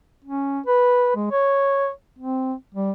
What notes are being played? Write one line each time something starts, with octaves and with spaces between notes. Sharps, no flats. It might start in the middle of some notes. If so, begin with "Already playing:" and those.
C#4
B4
G#3
C#5
C4
G3